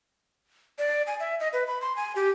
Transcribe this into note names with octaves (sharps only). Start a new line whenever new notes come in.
D5
G#5
E5
D#5
B4
B5
C6
G#5
G4